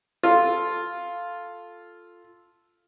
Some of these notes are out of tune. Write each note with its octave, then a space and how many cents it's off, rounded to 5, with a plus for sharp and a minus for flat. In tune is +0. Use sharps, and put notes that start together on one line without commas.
F4 +0 A4 +0